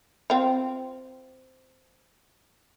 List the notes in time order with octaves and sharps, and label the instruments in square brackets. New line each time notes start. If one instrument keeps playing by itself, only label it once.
[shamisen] C4 F4